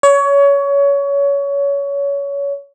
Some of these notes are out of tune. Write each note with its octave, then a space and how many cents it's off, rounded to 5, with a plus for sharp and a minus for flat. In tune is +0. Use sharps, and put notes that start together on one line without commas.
C#5 +25